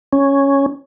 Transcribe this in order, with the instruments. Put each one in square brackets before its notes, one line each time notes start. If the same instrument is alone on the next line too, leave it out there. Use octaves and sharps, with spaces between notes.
[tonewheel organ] C#4